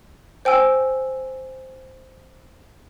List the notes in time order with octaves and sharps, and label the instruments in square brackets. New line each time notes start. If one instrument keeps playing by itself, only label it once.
[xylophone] C5 G5 G#5 E6